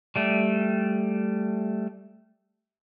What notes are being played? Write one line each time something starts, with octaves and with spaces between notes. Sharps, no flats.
G3 A3